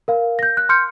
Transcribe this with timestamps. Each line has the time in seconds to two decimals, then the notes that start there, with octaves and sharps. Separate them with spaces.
0.08 A#4 F5
0.39 G6 A#6
0.57 F#6
0.69 C6 F6 G6 C#7